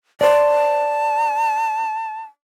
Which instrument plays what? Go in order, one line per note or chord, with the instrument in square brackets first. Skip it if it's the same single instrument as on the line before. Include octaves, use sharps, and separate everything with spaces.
[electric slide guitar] C5 D5 [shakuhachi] A5